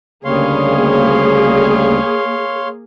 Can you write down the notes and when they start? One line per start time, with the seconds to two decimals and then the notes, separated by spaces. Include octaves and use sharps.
0.25 D2 C#3 G3 A#3 G#4 C#5 F5 C6